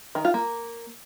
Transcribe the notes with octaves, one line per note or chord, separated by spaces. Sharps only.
D#3
F4
A#3